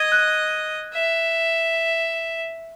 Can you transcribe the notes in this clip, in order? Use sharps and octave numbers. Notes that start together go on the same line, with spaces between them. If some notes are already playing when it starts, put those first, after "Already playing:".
Already playing: D#5 G#6
F#6
E5